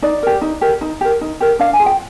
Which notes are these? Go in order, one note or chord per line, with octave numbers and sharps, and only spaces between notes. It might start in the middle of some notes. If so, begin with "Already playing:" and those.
D#4 D5
G4 A#4
D#4
G4 A#4
D#4
G4 A#4
D#4
G4 A#4
D4 F5
G#5
F4 G#4
G5